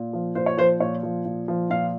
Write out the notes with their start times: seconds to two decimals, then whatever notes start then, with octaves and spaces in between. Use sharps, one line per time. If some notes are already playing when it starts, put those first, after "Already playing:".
Already playing: A#2
0.13 F3
0.35 A#2 C5
0.46 C#5
0.57 F3 C5
0.80 A#2 C#5
1.03 F3
1.25 A#2
1.48 F3
1.70 A#2 F5